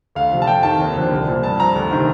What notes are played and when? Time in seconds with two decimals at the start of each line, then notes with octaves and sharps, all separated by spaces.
0.15 D2 F5
0.31 C3 F3
0.42 A5
0.47 F2 G5
0.63 D#3 A5
0.80 D#2
0.96 D3 F3
1.11 C2
1.28 A#2 F3
1.43 G2 A5
1.60 F3 A#5
1.75 D2
1.91 C3 D#3